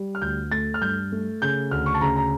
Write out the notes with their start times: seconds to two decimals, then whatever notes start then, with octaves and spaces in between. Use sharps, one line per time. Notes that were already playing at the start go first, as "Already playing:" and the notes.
Already playing: G3
0.15 F6
0.22 D2 G6
0.52 A3 A6
0.74 F6
0.81 G2 G6
1.12 A3
1.42 C#3 G6
1.71 D2 F6
1.86 C#6
1.94 A5
2.01 C#3 A#5
2.16 A#5